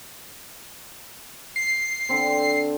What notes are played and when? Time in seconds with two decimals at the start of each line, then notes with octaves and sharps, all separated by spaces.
1.56 C7
2.09 D3 C4